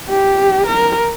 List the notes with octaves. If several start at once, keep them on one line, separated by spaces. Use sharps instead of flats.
G4
A#4